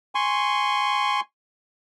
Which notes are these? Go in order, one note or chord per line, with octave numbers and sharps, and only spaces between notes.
G#5 C6 C#6